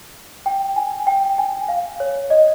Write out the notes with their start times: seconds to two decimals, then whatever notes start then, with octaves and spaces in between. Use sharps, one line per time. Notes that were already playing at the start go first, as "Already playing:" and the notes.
0.46 G5
0.76 G#5
1.07 G5
1.38 G#5
1.68 F5
2.00 C#5
2.30 D#5